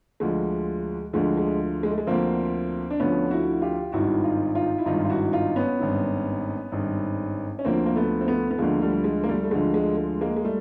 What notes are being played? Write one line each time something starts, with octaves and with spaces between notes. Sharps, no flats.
D2 D3 F3 G#3
D2 D3 F3 G#3
G#3
G#3
A3
G#3
D2 D3 F3 A#3 C4
D4
D2 D3 F3 B3 C#4
E4 F#4
F4 G4
G#1 G2 D#3 E4 F#4
D#4 F4
D#4 F4
E4
G#1 G2 D#3 D#4 F4
F4
E4 F#4
D#4 F4
B3 C#4
G#1 G2 D#3
G#1 G2 D#3
C#4
D2 D3 F3 A#3 C4
A#3
A3 B3
C4
A3 B3
B3
D2 D3 F3 G#3 A#3
G3 A3
G#3
A#3
G3 A3
A3
D2 D3 F3 G#3
G#3
G#3
G#3 A#3
G#3
G3 A3